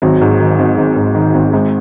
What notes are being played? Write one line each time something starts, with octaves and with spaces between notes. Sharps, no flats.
G#1 F#3
G#2
D#3
G#1
G#1
G#2
D#3
G#1
G#1 G#3